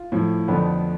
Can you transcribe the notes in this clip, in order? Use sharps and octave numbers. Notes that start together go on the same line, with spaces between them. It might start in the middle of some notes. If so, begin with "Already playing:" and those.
Already playing: F4
A2 F3
F2 D3 F3 B3 B4